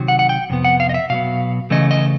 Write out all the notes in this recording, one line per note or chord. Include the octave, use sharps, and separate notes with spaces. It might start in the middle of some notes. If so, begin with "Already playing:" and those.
Already playing: C3 D#3 F#3
F#5
F#5
G5
F2 C3 B3
F#5
F5
D#5
E5
B2 F#3 B3 F5
C#3 E3 A3 C#4 D#5
D#5